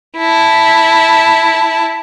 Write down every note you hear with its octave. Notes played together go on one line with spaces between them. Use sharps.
E4 A5